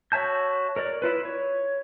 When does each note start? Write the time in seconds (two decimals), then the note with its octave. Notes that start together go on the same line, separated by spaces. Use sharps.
0.12 F#4 C#5 E5 A5 G6
0.76 A#4 C#5 D5
1.02 E4 F4 B4
1.25 C#5